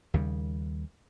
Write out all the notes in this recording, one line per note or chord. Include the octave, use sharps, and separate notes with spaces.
D#2 C#3 G3